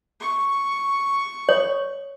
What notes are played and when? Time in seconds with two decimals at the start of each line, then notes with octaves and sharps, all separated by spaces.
0.20 C#6
1.49 C#5